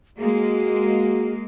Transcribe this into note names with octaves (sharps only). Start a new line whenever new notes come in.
G#3 A#3 F#4 G#4